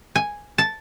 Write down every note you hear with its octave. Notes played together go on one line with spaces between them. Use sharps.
G#5
A5